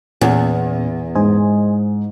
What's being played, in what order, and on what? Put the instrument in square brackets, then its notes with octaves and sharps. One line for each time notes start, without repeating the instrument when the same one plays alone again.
[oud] E2 [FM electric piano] A#2 B3 C#4
[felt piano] G#2 [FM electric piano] C5 D#5 G#5